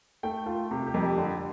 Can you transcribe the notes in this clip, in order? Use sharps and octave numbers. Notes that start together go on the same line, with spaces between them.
A3 G5
A3 F4
C3 G4
G4
F2
G4
D3